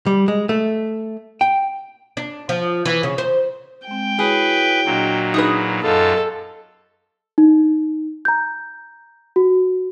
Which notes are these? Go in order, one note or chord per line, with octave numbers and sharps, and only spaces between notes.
G3
G#3
A3
G5
D4
F3
E3
C#3
C5
G#3 C4 G5
E4 F#4 G#4 B4 C#5
A#2 F#3 D4 F#4 D#5
D#4 G#4 B4
F#2 F4 A4 D#5 C6
D#4
A#5 G6
F#4